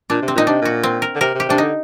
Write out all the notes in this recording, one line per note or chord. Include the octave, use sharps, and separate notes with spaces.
A#2 D4
C3
C4
A#2 D#4
C3 D4
A#2 F#4
C4
A#4
D3
C3 A#4
C3
G4
C3 D4
D3 D#4